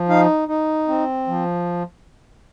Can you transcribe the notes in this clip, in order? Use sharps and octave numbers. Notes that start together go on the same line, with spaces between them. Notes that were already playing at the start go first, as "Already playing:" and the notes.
Already playing: F3
D#4 F5
D#4
C4
F3